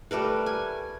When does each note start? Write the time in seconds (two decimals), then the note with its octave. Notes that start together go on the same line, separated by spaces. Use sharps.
0.11 G3 A3 A#4 B4
0.46 G#5